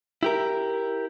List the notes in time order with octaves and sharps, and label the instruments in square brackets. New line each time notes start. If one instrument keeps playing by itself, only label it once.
[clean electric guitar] E4 G4 A#4